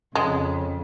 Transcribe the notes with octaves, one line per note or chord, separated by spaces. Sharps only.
F2 C#3 G#3